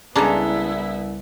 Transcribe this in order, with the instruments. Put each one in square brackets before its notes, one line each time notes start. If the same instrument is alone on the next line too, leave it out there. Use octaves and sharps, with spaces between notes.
[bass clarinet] C2 [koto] C#3 D4 [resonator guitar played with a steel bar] G#3 A4 A#5 [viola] B3 E4